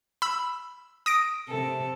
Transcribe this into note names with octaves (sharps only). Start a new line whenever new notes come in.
B5 E6
D#6 A#6 D7
C3 A4